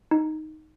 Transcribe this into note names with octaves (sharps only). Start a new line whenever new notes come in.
D#4